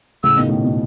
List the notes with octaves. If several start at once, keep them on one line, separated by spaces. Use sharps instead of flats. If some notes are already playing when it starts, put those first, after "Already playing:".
A2 C#3 E6
B2 D#3
A2
B2